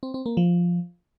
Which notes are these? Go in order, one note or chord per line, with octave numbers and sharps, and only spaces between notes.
C4
C4
A#3
F3